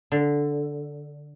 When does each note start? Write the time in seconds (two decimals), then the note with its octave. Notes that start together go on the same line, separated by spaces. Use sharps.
0.12 D3